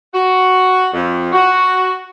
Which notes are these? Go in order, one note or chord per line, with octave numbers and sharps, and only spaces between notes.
F#4
F2
F#4